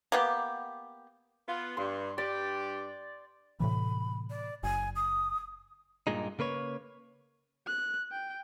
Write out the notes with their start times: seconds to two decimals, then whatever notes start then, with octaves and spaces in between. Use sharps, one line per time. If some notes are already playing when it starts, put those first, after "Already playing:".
0.12 A#3 B3 G4
1.48 B3 F4
1.77 G2 C6
2.18 G2 G4 D5
3.60 A2 C3 E3 B5
4.30 D5
4.63 F#1 G#5
4.96 D#6
6.07 G2 A#2 G#3 D#4
6.39 C#3 A#3 B4 C#5
7.67 F#6
8.11 G5